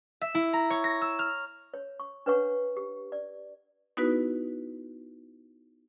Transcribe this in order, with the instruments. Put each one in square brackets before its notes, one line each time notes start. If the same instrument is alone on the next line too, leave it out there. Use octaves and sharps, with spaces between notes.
[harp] E5
E4
A#5
C#5
A#6
E6
F6
[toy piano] C#5
C#6
D4 B4 C#5 F#5 C#6
G4
D5
[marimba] B3 D#4 E4 F#4 B4